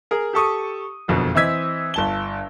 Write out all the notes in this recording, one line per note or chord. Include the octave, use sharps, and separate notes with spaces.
G#4 A#4
G4 A4 C#6 D#6
F#1 F2 B2 D3
E3 C4 D#5 E6 G#6 B6
G1 A5 G7